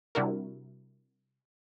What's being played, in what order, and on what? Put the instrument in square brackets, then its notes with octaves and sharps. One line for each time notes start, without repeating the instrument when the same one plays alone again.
[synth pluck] C3 G3 D4 E4 F#4 A#4